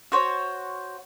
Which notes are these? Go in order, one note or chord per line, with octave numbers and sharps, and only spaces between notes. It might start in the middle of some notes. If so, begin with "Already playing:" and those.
F#4 C5 C#5